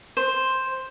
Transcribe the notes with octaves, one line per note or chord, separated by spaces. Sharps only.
C5